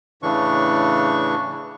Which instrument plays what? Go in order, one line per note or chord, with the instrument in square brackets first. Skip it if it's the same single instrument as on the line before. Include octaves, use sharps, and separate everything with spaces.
[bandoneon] A2 C#3 E3 D4 C#6